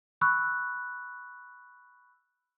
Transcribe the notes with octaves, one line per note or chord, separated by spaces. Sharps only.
B5 C#6 E6 F#6